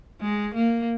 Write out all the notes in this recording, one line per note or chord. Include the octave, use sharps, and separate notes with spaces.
G#3
A#3